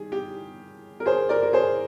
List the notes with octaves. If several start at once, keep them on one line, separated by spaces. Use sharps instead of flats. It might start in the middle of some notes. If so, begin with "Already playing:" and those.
Already playing: D#3 G3 G#4
G4
A#4
G#4 C5
A#4 D5
A#4
G#4 C5